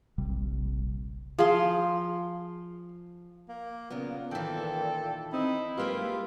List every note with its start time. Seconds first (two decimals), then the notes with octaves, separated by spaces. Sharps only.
0.18 D#1 A#1 C3 G3
1.39 F3 G#4 F5 C6
3.49 A#3
3.90 A#2 C#3 B3 A#4
4.31 D#3 E3 A4 G5
5.33 C4 D#4 E4
5.77 G#3 A#3 F4 G4 B4